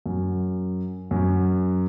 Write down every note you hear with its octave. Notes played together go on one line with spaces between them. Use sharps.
F#2
F#2